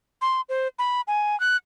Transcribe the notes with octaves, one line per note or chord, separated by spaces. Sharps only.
C6
C5
B5
G#5
F#6